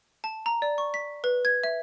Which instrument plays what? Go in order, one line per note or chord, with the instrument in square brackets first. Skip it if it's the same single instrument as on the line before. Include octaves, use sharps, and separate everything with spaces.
[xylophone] A5
A#5
D5
C#6
B6
B4
G#6
E5